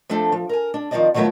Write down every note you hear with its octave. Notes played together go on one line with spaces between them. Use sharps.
F3 A3 C4 D4 A4
F3
A#4 G#5
D4
D#3 F3 A3 C4 D5 D#5
D#3 F3 F#3 A3 B3 E4